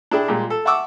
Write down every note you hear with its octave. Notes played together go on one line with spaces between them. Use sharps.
D4 E4 G#4 G5
A#2 G3 G#3
A4
E5 F#5 A5 C#6 D6 E6